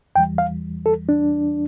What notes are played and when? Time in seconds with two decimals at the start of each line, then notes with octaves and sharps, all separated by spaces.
0.15 E2 E3 G3 G5
0.38 F5
0.86 A4
1.09 D4